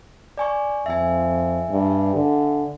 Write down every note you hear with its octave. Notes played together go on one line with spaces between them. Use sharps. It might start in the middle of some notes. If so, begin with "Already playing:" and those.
D5 G#5 C#6
F2 E5 G#5
G2
D3